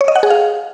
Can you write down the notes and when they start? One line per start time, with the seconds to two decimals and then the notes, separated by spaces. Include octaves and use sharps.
0.01 C#5
0.08 D#5
0.16 F#5
0.23 G#4
0.30 F5